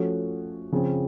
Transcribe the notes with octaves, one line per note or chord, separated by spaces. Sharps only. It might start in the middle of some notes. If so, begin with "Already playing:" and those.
Already playing: F3 A3 C#4 F#4
C#3 F3 C4